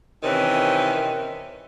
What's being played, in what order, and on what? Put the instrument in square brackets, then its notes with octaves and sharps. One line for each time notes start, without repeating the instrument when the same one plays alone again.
[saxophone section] C3 D#3 E3 C4 C#4